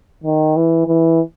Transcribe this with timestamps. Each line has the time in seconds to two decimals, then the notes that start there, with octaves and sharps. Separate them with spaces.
0.24 D#3
0.56 E3
0.87 E3